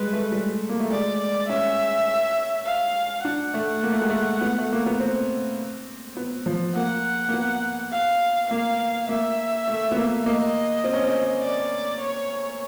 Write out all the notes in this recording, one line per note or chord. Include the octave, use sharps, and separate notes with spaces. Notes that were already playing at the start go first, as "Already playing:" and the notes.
Already playing: G3 G#3 B4
A3
G3
A#3
A3
G#3 D5
D5
C#4 E5
F5
D4 F#5
A3
A#3
A3
G#3
A3
B3
A3
A#3
B3
C4
B3
F3
A#3 F#5
A#3
B3
F5
A#3 F5
A#3 E5
A3
B3
A#3
A#3 D#5
C4
C#4
C4
D5
C#5